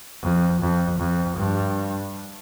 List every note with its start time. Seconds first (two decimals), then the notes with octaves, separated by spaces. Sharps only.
0.22 F2
0.61 F2
0.99 F2
1.37 G2